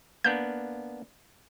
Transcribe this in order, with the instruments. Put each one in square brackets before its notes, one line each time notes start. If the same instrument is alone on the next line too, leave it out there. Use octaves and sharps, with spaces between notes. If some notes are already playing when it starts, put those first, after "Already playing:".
[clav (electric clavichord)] A#3 B3 D4 [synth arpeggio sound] G6